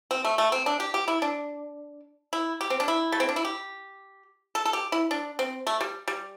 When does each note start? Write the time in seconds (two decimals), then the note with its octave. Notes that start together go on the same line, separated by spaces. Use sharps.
0.11 C4
0.25 A3
0.38 A3
0.52 C4
0.66 D4
0.80 G4
0.94 G4
1.08 E4
1.22 D4
2.33 E4
2.61 G4
2.70 C4
2.80 D4
2.88 E4
3.12 A3
3.20 C4
3.29 D4
3.36 E4
3.45 G4
4.55 A4
4.65 A4
4.73 G4
4.92 E4
5.11 D4
5.39 C4
5.67 A3
5.81 G3
6.08 G3